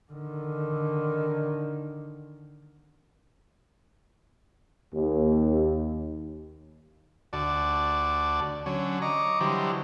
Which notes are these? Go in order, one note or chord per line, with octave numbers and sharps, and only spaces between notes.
D3 D#3
D#2
D2 F#4 D5 A5
D3 F#3 C#4
D#5 A#5 C#6 D6
D3 E3 F#3 G3 C5